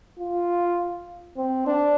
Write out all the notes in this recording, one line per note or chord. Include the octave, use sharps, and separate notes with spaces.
F4
C4
D4